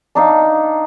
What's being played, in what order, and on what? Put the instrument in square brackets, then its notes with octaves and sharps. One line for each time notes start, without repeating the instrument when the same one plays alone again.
[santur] D4 D#4 F5